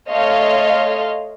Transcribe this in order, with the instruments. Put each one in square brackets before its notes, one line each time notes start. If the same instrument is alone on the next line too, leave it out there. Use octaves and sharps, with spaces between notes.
[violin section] A3 C#5 D#5 F5 C6 F6